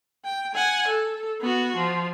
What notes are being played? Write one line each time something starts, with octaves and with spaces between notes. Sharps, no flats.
G5
F#5 G#5
A4
B3 F#4
F3